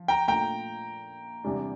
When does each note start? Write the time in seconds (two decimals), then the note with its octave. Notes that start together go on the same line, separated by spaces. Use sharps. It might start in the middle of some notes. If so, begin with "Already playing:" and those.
Already playing: F3
0.08 G5 A#5
0.28 A#2 A3 D4 F4 G5 A#5
1.44 E2 C3 G3 D4